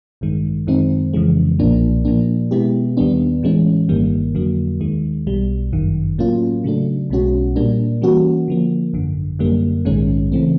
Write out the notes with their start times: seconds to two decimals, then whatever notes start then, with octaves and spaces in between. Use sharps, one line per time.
0.21 A1 G2 D#3 G#3
0.67 F#2 D#3 G#3 C4 D#4
1.13 F2 C#3 E3 G#3
1.59 B1 A#2 F3 A#3 D4
2.05 A#2 F3 A#3 D4
2.51 B2 G#3 B3 E4 G4
2.97 D#2 D#3 G3 B3 D4
3.43 A2 E3 G#3 C#4
3.89 G1 G2 D#3 G3 A#3
4.35 F2 D3 F#3 A#3
4.80 D#2 D#3 G#3
5.27 B1 B2 G3
5.73 G1 F#2 D#3
6.18 A2 F#3 A#3 C#4 F4
6.64 C#3 F#3 A3 D4
7.10 B1 B2 G#3 C#4 F#4
7.56 A#2 G3 A#3 D4
8.02 E3 G3 A#3 C#4 F#4
8.48 D3 F3 A#3
8.93 G#1 F#2 D3
9.39 F#2 D3 G3 A#3
9.85 A#1 G#2 D#3 G#3 C#4
10.32 C#3 E3 A3 C4